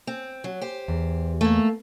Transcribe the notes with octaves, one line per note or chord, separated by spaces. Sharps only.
C4
F#3
G4 C5
E2
A3 A#3